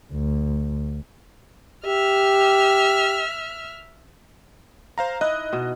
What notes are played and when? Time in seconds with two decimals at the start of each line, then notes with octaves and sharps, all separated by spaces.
0.13 D2
1.86 G4 E5 F6
4.98 C5 F5 A#5
5.21 D#4 E4 D#5 F#6
5.53 B2